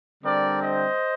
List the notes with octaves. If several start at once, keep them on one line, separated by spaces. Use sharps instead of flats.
D3 G3 C4 A#4 D5
C5 D#5